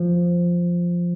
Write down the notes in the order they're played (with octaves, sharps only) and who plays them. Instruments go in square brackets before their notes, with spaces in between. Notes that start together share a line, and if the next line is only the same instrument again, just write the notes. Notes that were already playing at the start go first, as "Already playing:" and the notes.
Already playing: [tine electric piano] F3